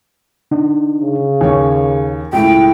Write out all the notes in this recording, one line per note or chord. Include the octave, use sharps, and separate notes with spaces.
D3 D4 D#4
C#3
D#2 C#5 G#5
C#2 A2 G5